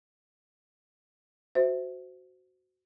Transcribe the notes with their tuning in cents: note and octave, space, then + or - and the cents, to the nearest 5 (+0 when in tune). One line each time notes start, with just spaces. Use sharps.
F#4 +0 C5 -15 E5 -5